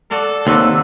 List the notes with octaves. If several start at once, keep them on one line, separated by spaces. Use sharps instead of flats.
F#4 A4 D5 F5
D#2 C3 F#4 B4 E6